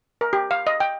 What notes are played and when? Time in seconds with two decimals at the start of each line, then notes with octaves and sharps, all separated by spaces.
0.21 A#4
0.33 G4
0.51 F5
0.67 D#5
0.80 G5